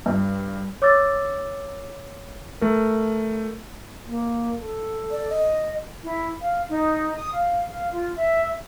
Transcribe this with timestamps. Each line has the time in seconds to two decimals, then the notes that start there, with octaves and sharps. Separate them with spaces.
0.06 G2
0.82 C#5 D6 E6 A6
2.61 A3 A#4
4.04 A#3
4.60 A4
5.11 D5
5.30 D#5
6.03 E4
6.40 F5
6.69 D#4
7.16 D#6
7.33 F5
7.69 F5
7.91 F4
8.15 E5